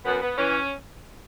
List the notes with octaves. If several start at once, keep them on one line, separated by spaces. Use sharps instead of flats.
F#2 B3
B3
E3 C#4